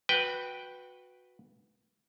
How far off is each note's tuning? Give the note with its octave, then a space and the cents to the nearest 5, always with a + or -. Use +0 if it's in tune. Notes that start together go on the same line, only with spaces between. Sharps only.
F#4 -20 B4 +0 G5 +0